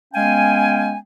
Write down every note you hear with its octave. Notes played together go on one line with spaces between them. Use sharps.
G#3 B3 C#4 F5 G5 G#5